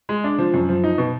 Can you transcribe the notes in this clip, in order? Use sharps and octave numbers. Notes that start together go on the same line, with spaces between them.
G#3
D4
F3
F#2
F3
D#4
B2